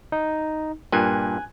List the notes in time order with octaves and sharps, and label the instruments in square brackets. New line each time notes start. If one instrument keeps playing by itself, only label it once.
[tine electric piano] D#4
[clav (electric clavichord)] G2 A#2 [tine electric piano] G#5 F#6 G#6